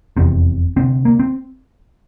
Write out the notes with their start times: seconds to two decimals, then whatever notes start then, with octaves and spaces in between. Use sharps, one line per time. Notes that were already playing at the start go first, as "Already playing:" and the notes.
0.17 F1 E2 C3 C4
0.76 D2 C3 C4
1.05 A#3
1.20 C4